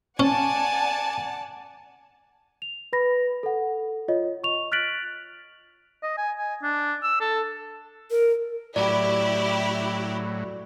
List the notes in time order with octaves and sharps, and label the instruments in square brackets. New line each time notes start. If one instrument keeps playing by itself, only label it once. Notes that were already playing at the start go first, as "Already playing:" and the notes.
[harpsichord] C#4 [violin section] D5 F#5 A5 [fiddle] G#5
[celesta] F7
B4 B5 A#6
A4 F#5
F4 C#5 D#5
C#6 F7
F6 F#6 A6 B6 D7 F#7
[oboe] D#5
G#5
G#5
D4
E6
A4
[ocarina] A#4
[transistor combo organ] A2 F#3 [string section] E4 G4 [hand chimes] D5